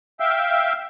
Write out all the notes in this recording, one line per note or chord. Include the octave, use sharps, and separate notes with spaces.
E5 F5 G5 E6